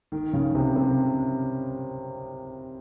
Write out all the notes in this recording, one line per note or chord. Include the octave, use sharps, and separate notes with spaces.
D#3
C#3
C3
C3